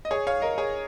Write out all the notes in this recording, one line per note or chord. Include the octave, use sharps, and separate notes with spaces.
D#5
G#4 C#5
C#5 F5
A#4 D#5
G#4 C#5